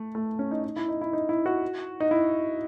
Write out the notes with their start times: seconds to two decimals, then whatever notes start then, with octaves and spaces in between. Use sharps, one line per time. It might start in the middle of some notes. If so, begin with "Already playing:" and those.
Already playing: A3
0.15 A3
0.39 C#4
0.51 D#4
0.64 D#4
0.76 E4
0.88 D#4
1.01 E4
1.13 D#4
1.29 E4
1.46 F#4
2.00 D#4
2.11 E4